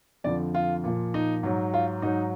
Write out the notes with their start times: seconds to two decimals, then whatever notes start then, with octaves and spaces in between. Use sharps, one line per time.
0.24 F2 D3 F3 D5
0.55 F4
0.84 A#2 F3
1.14 D#4
1.43 G#2 F#3
1.74 F4
2.02 G#2 F#3 D#4